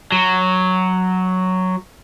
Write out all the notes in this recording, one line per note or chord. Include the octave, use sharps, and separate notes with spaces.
F#3